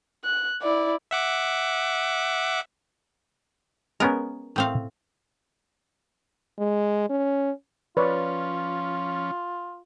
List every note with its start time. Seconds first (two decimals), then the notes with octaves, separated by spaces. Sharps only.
0.24 F#6
0.62 E4 D5
1.11 E5 F#5 D6
4.00 G#3 B3 C#4 A#4
4.56 A2 C4 F5
6.59 G#3
7.10 C#4
7.97 F3 C#4 F4 B4 C#5 D5